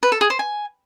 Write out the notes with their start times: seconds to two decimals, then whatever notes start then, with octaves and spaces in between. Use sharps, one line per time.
0.03 B4
0.12 A4
0.21 G#4
0.30 C5
0.39 G#5